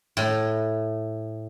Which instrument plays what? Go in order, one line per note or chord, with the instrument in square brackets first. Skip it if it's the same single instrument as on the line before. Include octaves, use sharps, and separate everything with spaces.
[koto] A2